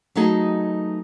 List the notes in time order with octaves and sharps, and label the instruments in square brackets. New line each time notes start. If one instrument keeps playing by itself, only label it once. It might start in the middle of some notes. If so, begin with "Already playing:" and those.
[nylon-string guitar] F#3 A3 B3 D#4 G#4 D#5